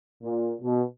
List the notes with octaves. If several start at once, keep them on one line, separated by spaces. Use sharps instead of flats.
A#2
B2